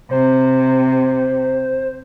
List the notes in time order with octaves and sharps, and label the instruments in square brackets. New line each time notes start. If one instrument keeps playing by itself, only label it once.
[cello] C3 [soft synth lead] C5